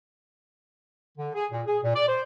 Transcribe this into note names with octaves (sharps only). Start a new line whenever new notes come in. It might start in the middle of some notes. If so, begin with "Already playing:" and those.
D3
G#4
A#2
G#4
A#2
D5
C5